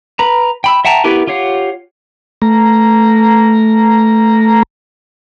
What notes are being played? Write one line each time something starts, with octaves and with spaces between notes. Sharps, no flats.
B4 A#5
G5 B5 E6
E5 F#5 G5 A5 A#5
B3 E4 G4 A#4 B4
F4 G4 C#5 F5 F#5
A3 A#5